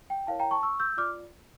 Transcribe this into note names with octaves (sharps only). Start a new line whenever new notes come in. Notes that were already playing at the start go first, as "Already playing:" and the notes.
G5
E4 A#4 C#5 F5 A5
G5 A#5
A5 C#6
C#6 E6
E6 G6
F4 D5 D6 F6